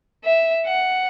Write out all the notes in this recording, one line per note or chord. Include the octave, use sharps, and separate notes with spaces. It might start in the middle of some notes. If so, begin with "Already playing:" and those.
E5
F#5